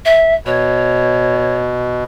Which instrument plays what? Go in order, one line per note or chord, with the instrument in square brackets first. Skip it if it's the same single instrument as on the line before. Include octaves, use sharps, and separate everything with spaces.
[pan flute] E5
[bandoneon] B2 [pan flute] C#5